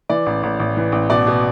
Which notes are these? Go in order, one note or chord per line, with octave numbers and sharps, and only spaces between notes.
E3 D5
A1
A1
A1
E3
A1
B2 D5
B2